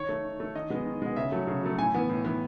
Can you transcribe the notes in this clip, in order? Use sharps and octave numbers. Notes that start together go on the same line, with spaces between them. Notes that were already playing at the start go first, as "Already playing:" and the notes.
Already playing: D#3 C#5
A3
D#3
A3
D#3 D#5
G#3 B3
D#3
G#3 B3
C#3 E5
F#3 A3
C#3
F#3 A3
A2 G#5
E3 B3
A2
E3 B3